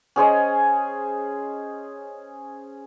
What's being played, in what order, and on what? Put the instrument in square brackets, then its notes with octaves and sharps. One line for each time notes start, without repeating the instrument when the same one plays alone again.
[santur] C#4 G#4 C5 D#5